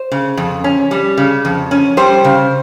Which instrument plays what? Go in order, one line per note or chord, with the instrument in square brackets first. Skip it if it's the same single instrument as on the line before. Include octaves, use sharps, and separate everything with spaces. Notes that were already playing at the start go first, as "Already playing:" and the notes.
Already playing: [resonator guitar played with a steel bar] C5
C#3
F2
C#4
G3
C#3
F2
C#4
G3 C5
C#3